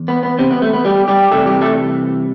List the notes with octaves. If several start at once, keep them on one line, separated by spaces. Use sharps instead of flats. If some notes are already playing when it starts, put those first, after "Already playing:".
Already playing: E2
B3
B3
C3 C4
B3
A3
B3
G3 G4
G3 G4
C2 C3 E3 A3 A4
G3 G4
A3 A4